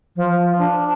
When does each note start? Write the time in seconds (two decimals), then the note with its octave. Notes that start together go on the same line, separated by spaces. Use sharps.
0.16 F3
0.58 D4